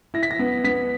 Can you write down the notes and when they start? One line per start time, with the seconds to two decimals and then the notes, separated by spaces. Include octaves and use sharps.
0.14 E4 A#6
0.23 B6
0.31 A#6
0.39 B3
0.64 B3 B6